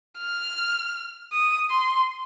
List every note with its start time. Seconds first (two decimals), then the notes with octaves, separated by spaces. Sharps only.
0.19 F6
1.33 D#6
1.70 C6